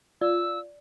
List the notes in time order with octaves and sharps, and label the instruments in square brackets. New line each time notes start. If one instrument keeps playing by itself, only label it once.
[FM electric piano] F4 [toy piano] D5 [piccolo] E6